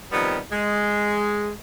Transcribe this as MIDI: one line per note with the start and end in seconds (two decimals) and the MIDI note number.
0.12 0.38 48
0.12 0.38 51
0.12 0.38 53
0.12 0.38 55
0.12 0.38 59
0.52 1.50 56